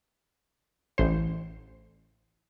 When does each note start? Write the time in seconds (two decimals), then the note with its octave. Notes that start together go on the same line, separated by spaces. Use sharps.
0.98 A1 C5